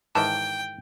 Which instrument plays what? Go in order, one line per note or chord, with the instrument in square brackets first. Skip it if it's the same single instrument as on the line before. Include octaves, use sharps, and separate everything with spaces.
[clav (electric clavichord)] G#2 D#3 E3 [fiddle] G5 [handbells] A5